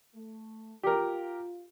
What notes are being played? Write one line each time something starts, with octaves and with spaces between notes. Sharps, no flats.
A3
F4 G4 A#4